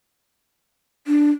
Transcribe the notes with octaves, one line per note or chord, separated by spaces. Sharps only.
D4